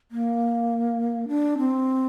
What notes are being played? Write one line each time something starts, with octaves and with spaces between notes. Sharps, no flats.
A#3
D4
C4